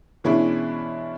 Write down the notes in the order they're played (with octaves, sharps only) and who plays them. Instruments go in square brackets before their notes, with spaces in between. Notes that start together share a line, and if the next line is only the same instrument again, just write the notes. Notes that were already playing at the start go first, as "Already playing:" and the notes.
[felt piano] B2 E3 G#3 C#4 D4 E4